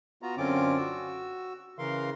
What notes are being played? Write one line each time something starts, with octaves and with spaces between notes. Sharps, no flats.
B3 F4 F#4 A#5
F#2 D3 C4 C#4 F4 D6
F#4 E6
C#3 E3 A#4 F5 C6